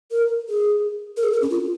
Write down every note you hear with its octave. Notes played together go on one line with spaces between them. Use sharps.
A#4
G#4
A#4
G#4
A#4
C#4
F4